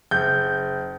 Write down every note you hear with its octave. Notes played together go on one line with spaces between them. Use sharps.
F#1 G6